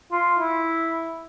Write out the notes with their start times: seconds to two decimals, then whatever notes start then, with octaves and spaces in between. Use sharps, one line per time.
0.12 F4
0.39 E4